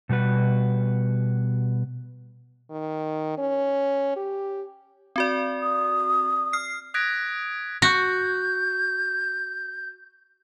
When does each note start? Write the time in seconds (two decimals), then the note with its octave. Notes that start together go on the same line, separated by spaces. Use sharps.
0.09 B2 G3 F#4 B4
2.71 D#3
3.38 C#4
4.16 G4
5.16 C4 F#4 D5
5.62 D#6
6.53 F6 C7
6.94 D#6 F#6 G#6 A#6 B6 D7
7.82 F#4 G6